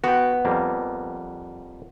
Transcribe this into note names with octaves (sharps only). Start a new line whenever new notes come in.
B3 F#4 G5
F2 G3 A#3